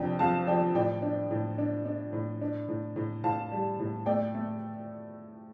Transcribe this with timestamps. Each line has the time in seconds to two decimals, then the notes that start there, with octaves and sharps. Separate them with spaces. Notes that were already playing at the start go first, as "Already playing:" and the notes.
Already playing: F2 C3 D4 D5 G5
0.19 F2 F5 A5
0.47 F3 D5 G5
0.75 A2 D5 G5
1.02 D4
1.31 A2
1.58 D4
1.85 D4
2.13 A2
2.41 D4
2.68 A2
2.96 A2
3.24 A2 F5 A5
3.52 G3
3.80 A2
4.06 A3 D5 G5
4.35 A3